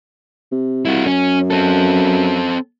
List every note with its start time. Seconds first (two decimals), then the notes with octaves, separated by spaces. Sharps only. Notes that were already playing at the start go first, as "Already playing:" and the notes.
0.52 C3
0.85 C2 E4 F#4
1.06 F#2 C#4
1.51 C4 A4